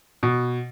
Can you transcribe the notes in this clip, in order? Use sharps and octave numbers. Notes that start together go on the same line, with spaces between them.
B2